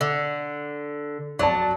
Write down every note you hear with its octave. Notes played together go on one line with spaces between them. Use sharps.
D3
F#3 D5 A5